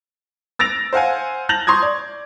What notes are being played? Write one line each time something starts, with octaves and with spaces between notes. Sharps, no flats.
E6 A6 A#6 D7 F7
C5 F5 F#5 G#5
A5 G6 A6 A#6 F7 F#7
C6 C#6 D#6 G#6
D5